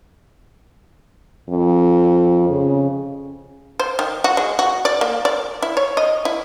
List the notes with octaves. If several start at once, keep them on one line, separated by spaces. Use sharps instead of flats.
F2
C#3
C5
D#3
F#4
G#3
F#4
D5
A#3
D5
E4
C#5
D#5
E4